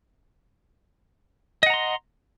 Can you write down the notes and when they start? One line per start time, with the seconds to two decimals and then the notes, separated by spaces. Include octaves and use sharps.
1.63 D#5
1.66 F#5
1.70 A#5
1.74 C6